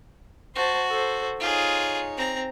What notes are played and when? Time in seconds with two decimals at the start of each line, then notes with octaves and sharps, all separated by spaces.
0.55 F#4 C5 A5
0.90 A4 C5
1.40 D#4 F4 G#4 C#5
2.17 C4 A#5